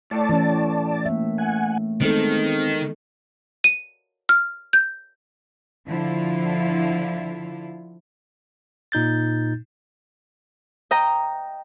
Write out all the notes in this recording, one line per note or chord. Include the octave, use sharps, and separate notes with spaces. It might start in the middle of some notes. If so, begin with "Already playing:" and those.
A2 A3 D5 A5
E3 C#4
A#3 E5
F#5 G#5
D#3 G#3 B3 C4 A4
D#7
F6
G6
D3 F3 E4 F4
A#2 D#4 G6 A6
D#5 G5 A#5